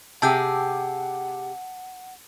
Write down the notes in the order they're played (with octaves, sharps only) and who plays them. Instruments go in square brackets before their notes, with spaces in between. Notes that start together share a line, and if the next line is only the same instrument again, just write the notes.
[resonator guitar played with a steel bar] C3 G4 G#4 [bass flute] F#5 [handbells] A5 E6 G6